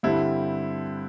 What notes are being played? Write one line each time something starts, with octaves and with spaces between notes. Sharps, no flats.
G2 D3 G3 C4 E4